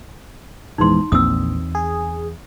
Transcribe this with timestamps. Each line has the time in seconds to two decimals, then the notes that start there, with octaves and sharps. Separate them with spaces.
0.78 A#1 E2 G#2 D#4 C6
1.12 A#1 E2 C4 D#6 E6
1.75 G#4